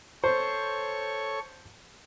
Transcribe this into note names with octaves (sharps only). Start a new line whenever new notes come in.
A4 C5 C#5 C#6